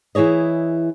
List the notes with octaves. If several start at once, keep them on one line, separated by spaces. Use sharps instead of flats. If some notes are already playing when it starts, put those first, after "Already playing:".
E3 E4 G#4 C#5 D#5